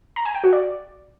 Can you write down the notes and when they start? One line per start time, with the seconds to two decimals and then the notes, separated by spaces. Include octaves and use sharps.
0.16 A#5
0.25 G#5
0.34 G5
0.44 F#4
0.53 D5